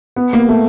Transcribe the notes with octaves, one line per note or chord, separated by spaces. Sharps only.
B3
A#3
A3